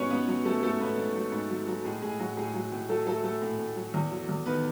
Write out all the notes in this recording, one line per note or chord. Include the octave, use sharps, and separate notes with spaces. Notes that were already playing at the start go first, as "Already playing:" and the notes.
Already playing: G#2 F#3 B3 C#4 B4 C#5
G#2 B3 B4
F#3
F#3 A3 A4
G#2 A3 A4
G#2 B3 B4
G#2
F#3
G#2
F#3
F#3
A2 G#3 G#4
A2 G#3 G#4
A2 F#3 F#4
A2 G#3 G#4
F#3
A2
F#3 A3 A4
F#3 A3 A4
F#3 A3 A4
A2
A2
F#3
E2
F#3
E2
D#3 B3 B4